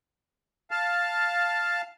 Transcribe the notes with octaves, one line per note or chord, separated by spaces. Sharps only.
F5 A5